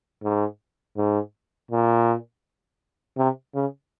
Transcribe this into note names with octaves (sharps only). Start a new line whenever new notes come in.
G#2
G#2
A#2
C3
C#3